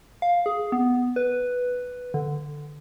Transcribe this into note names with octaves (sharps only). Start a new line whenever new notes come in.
F5
G#4
B3
B4
D3